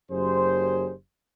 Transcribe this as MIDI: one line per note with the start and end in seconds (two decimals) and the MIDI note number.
0.11 0.92 30
0.11 0.92 42
0.11 0.92 67
0.11 0.92 68
0.11 0.92 72